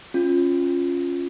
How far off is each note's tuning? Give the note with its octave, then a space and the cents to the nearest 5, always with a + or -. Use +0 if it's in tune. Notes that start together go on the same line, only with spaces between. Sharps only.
C#4 -10 F4 +0